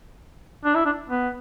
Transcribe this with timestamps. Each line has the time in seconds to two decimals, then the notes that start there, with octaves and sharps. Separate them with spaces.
0.65 D4
0.75 E4
0.85 D4
1.09 B3